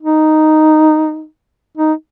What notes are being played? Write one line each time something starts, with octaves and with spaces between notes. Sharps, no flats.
D#4
D#4